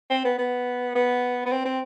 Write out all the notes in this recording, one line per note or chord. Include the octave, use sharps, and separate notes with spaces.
C4
B3
B3
B3
B3
C4
C4